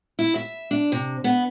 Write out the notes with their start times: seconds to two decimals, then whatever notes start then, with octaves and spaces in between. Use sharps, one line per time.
0.19 E4
0.35 E5
0.71 D4
0.92 C3
1.24 B3